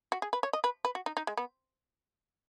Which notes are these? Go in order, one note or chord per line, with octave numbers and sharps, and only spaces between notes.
F#4
G#4
B4
C#5
D#5
B4
B4
F#4
D#4
D#4
G#3
B3